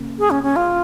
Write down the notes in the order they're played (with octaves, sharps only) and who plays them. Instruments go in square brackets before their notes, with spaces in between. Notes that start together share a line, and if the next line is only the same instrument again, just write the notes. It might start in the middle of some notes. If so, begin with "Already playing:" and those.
Already playing: [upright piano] C#3 A#3
[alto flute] G#4
C#4
C#4
F4